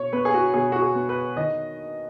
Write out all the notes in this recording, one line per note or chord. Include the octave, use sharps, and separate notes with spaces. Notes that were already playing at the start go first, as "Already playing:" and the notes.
Already playing: B2 C#5
B3 B4
G#4
F#4
B2 G#4
F#4
G#4
B3
B4
D#3 D#5